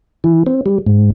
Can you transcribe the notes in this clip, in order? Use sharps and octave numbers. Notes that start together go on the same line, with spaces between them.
E3
C4
G3
G#2